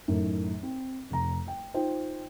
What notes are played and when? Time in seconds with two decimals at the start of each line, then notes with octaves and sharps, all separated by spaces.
0.08 F#2 A2 D#3
0.63 C4
1.10 F1 A#5
1.48 G5
1.74 D#4 F4 C5 G5